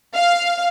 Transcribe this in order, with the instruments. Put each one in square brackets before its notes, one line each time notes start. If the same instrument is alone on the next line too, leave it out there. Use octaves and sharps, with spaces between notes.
[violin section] F5